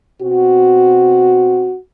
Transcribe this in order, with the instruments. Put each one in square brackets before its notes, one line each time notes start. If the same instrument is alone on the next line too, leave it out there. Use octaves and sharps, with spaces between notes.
[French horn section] B2 C4 F#4